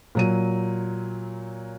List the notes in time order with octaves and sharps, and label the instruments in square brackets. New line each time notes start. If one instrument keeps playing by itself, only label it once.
[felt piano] A#2 F#3 D#7